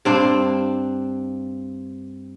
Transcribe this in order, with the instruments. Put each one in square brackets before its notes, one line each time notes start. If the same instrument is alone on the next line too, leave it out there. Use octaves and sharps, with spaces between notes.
[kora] G2 C4 D4